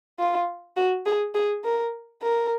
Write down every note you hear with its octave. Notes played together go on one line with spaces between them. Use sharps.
F4
F#4
G#4
G#4
A#4
A#4